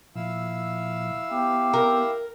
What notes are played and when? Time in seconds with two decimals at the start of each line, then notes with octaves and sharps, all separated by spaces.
0.16 A#2 F3 E4 F5 E6
1.31 B3 G4
1.73 A#4